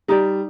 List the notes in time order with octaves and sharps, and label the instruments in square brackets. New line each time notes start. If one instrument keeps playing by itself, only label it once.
[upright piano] G3 [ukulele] D#4 G4 D5